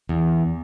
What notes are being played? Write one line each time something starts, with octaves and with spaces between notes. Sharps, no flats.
E2